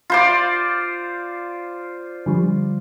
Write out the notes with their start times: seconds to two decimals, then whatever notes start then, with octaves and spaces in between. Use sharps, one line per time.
0.10 F4 C5 D5
2.26 D3 F3 G3